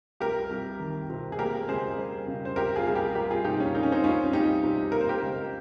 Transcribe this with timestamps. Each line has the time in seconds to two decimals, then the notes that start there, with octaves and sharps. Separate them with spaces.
0.20 C2 G4 A#4
0.51 C2
0.80 D#3
1.10 C3
1.32 G#4
1.38 A#3 G4 A#4
1.68 C#2 G#4 C5
1.98 G3
2.27 C#3
2.45 C5
2.56 C2 G4 A#4
2.76 F4 G#4
2.86 C2 G#4
2.95 G4 A#4
3.15 G3 G4 A#4
3.31 F4 G#4
3.44 C3 D#4 G4
3.60 C#4
3.75 A#3 D#4
3.83 C#4
3.92 C4 D#4
4.04 C2 C#4 F4
4.33 G3 D#4 G4
4.64 C3
4.92 A#3 A#4
5.01 C5
5.09 G4 A#4
5.22 C#2